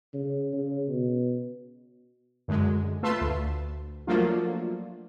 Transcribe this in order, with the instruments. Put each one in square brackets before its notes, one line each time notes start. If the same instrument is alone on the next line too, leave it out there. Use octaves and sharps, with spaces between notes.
[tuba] C#3
C#3
B2
[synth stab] F#2 D3 G#3
A3 F4 B4 E5 A5 C6
D2
F3 F#3 A3 A#3 D4 F4